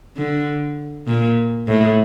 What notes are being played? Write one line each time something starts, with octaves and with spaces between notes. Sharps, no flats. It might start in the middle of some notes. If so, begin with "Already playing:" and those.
D3
A#2
A2